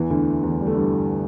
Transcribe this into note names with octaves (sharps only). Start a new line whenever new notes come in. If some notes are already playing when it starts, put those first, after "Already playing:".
Already playing: E2 E3
D2 D3
E2 E3
G3
A3
G2 G3